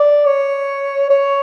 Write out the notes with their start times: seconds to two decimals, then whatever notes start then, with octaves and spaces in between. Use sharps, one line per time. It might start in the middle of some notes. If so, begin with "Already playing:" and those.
Already playing: D5
0.26 C#5
1.10 C#5